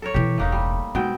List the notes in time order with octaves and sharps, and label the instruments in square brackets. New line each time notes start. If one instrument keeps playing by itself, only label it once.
[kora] A4 A#4 C#5
[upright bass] B2 E3 [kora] G4
[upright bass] E1 C#2 [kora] A3 A#3 D#4
[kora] G3
[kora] B2 C4 G5 [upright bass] G#3 D#4